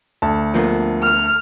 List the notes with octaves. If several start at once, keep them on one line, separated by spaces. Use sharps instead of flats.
D2 A5
F3 A#3 B3
F6